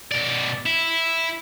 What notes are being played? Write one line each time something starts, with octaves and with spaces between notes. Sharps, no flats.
B2 D5
E4